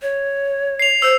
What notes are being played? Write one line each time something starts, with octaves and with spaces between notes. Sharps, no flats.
C#5
C7 F7
C5 E6